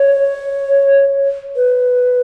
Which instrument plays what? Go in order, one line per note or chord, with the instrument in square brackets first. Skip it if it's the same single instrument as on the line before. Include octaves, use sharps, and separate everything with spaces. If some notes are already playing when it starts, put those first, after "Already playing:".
Already playing: [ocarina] C#5
B4